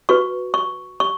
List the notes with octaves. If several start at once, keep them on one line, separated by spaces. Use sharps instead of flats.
F#4 B4 C#6
C#6
C#6